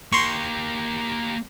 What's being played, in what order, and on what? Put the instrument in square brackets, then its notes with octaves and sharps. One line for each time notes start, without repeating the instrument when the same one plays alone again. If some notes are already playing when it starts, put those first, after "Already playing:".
[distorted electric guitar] A#3 G4 [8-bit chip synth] C6 C#6